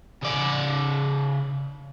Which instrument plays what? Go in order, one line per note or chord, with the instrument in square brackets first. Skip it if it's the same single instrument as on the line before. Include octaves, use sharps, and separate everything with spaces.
[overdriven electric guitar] C#3 D5